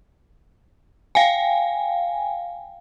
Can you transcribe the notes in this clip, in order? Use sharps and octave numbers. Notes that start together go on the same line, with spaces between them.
F5 G5 G#5